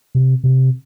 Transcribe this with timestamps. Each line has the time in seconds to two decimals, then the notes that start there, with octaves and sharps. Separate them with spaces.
0.15 C3
0.44 C3